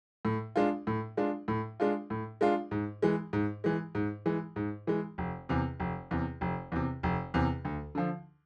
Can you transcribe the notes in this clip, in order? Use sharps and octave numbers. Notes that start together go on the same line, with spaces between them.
A2
G#3 D4 F4
A2
G#3 D4 F4
A2
G#3 D4 F4
A2
G#3 D4 F4
G#2
E3 G#3
G#2
E3 G#3
G#2
E3 G#3
G#2
E3 G#3
F1
E2 C3
F1
E2 C3
F1
E2 C3
F1
E2 C3
D2
D3 F3